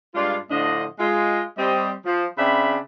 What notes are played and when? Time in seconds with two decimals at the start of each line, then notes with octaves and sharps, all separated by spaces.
0.15 G2 G#3 D4 F4
0.50 A2 D3 F3 D4 D#5
0.99 G#3 F4 D#5
1.57 G3 C4 D#5
2.05 F3
2.37 C#3 C4 D4 E5 B5